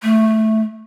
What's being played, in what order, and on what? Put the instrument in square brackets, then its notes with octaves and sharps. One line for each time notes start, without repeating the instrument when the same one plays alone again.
[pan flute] A3